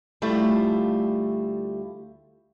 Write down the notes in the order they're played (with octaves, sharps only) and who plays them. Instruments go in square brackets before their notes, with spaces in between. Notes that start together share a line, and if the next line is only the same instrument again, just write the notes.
[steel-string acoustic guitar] D2 G3 A3 E4 F4